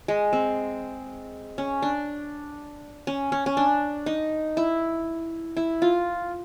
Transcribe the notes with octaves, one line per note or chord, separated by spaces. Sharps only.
G#3
C4
C#4
D4
C#4
C#4
C#4
D4
D#4
E4
E4
F4